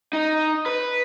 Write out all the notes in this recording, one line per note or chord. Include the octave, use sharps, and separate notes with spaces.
D#4
B4